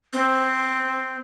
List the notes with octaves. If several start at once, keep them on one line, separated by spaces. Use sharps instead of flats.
C4